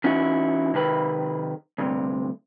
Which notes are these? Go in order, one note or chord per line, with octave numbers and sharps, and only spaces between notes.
E3 C#4 D#4 E4 F#4
C3 D#3 B4 B5
D2 G2 C3